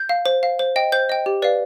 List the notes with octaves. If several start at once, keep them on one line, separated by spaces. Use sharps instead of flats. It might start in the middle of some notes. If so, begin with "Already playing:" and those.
Already playing: G6
F5
C5
F5
C5
D#5 G5
C5 G6
D#5 G5
G4
B4 D5 F5